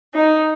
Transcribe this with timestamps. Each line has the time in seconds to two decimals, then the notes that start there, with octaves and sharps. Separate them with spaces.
0.13 D#4